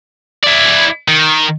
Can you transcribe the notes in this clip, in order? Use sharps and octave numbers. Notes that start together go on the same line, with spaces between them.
E4 D5
D#3